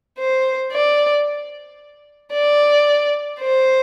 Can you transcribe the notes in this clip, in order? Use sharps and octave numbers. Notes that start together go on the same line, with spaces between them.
C5
D5
D5
C5